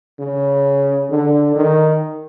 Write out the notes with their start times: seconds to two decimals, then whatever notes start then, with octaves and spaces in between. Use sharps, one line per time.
0.19 C#3
1.10 D3
1.56 D#3